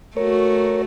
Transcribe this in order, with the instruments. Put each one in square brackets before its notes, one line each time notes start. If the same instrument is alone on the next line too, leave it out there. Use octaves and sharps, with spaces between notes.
[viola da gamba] A3 F#4 [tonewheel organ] A#4 C#5